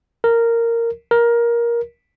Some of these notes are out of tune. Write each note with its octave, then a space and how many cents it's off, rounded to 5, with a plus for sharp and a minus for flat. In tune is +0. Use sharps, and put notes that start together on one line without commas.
A#4 -10
A#4 +15